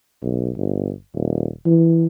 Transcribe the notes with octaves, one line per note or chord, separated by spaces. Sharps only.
B1
G1
D#1
E3